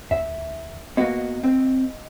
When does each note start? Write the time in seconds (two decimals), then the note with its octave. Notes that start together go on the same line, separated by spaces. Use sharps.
0.11 D2 E5
0.97 A#3 B3 F#4 D#5 F5
1.44 C4